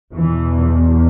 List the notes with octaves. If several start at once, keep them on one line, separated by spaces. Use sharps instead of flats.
E2 E3
B2